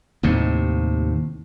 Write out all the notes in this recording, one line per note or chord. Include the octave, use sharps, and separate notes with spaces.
D#2 A2 C3